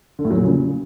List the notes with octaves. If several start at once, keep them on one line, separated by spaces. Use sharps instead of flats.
D3
A2
F#3
A#2
C#3